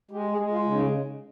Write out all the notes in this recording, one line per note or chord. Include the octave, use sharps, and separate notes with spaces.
G#3 G4
G#4
G#3
F4
C#3
D#4